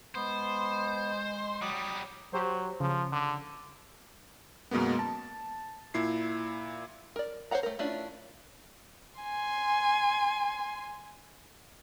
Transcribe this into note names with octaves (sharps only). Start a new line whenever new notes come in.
G#3 B3 C5
F#3 G3 D6 D#6
F#3 G4 C5
C#3 F3
D3
F#2 B2 G#3 A#3 B3
A5
A#2 E4 C7
A#4 D5
C5 C#5 F5 F#5 A#5
A3 A#4
A3 C#4 D4 E4 F4
G#5 C6